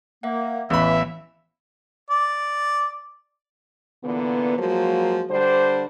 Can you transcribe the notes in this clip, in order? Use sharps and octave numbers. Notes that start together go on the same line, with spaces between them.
A#3 E5 F#5
A1 E3 B3 E5 F5 B5
D5
A#2 D3 E3 B3
F3 F#3 G#3 A#3 F#4
D3 G3 D4 C5